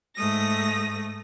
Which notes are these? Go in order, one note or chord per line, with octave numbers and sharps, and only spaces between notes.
G#2 A3 D#6 A#6